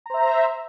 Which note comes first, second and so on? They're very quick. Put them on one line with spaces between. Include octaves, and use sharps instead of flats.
A#5 C5 E5